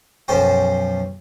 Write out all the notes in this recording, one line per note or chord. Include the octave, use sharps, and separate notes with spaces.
B1 F#2 F3 C#4 C5 G5